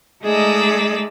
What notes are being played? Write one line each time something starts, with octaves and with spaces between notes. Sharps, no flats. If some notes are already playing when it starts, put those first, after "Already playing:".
G#3 A3 D#4 G#4 D5 E6